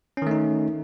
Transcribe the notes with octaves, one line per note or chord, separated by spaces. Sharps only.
D#3 A3 C#4 D#4